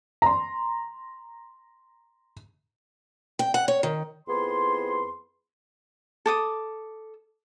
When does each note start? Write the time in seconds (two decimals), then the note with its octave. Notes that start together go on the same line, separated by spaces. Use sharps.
0.22 A#5 C6
3.39 G5
3.54 F#5
3.68 C#5
3.83 D#3
4.28 F2 B3 E4 G#4 C6
6.26 A4 D6 D#6